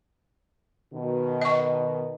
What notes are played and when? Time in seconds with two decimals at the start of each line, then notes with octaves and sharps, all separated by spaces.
0.93 B2 D#3
1.42 D#5 C#6